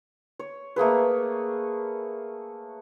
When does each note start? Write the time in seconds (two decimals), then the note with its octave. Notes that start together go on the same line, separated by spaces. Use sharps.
0.39 C#5
0.76 A3 A#3 G#4 B4